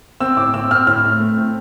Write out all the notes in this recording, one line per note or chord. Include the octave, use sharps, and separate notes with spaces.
C4 E6
A2 D6
C4 E6
C4 F6
A2 F6
A3
A3
C4